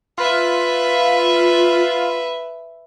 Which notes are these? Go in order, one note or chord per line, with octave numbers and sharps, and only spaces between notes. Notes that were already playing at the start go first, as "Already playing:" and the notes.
F4 B4 E5